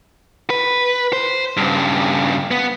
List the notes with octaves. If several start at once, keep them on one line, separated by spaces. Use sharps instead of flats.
B4
C5
G2 C#3
B3